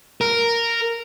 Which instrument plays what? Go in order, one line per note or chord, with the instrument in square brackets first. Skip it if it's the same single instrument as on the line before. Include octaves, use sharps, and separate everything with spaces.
[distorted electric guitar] A#4